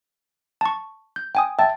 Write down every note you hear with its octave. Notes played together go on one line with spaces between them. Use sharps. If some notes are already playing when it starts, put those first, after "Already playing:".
A5 C#6
G6
G5 G#5 D#6
E5 G5 A5